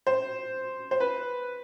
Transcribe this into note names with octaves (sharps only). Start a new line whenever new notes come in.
C5
C5
B4